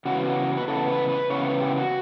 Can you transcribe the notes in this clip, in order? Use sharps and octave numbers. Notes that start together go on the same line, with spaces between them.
C#3 E3 B3 F#4
B4
C#3 E3 B3 A4
B4
B4
C#3 E3 B3 C#5
B4
G4
F#4